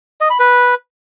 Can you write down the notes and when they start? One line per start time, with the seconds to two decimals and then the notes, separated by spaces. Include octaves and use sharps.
0.21 D#5
0.30 B5
0.40 B4